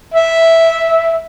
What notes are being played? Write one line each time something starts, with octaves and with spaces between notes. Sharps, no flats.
E5